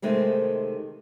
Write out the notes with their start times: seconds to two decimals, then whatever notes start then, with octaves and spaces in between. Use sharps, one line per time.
0.02 C3 D#3 G#3 A3 C4